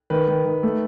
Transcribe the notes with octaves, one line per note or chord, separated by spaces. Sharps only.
D#3 B4
D#3
D#3
A3